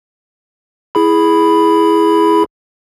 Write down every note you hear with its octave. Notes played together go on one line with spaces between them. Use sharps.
E4 G#4 B5